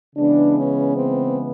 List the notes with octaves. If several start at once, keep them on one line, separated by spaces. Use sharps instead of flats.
C#3 E3 G#3 B3 D4
C#4
C4